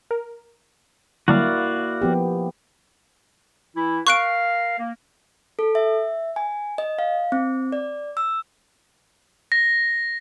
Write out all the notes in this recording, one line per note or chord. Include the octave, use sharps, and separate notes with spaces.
A#4
D3 F#3 G3 A#3 E4 F#4 D5 F5
F3 B3 G4
E3 E4
A#4 F5 C#6 F#6 D7
A#3
A4
E5
G#5
D#5
F5
C4
D5
E6
A#6